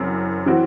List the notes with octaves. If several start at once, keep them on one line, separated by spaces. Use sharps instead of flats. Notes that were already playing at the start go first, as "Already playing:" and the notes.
Already playing: F#1 F#2 E3 C4
E3 C4 F#4